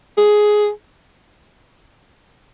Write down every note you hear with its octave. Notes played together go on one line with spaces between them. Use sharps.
G#4